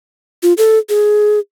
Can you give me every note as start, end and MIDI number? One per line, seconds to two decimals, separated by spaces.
0.43 0.53 65
0.58 0.78 69
0.89 1.39 68